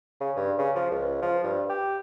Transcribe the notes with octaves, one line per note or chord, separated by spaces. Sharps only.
C#3
G2
C#3
F3
C#2
F3
G2
G4